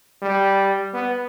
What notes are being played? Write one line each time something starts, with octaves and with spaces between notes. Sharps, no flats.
G3
B3